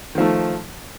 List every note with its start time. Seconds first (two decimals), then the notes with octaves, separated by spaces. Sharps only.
0.15 D#3
0.18 F3
0.21 A3